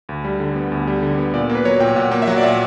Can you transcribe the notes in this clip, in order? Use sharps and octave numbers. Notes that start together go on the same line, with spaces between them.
D2
G3
D3
B3
D2
G3
D3
B3
A#2 D5
A#3
B4
F#3 C#5
A#2 G5
A#2 F#5
A#3
E5
F#3 F#5
D5
A#2 E5